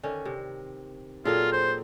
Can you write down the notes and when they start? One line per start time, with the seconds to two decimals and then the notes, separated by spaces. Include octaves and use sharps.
0.03 D3 D#3 C#4
0.25 C3
1.25 A#2 F#3 C4 F4 G#4 A4
1.52 C5